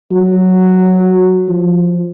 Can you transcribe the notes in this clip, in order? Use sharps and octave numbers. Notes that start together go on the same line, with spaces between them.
F#3
F3